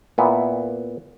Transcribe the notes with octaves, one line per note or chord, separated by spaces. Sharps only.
A#2 B3 E4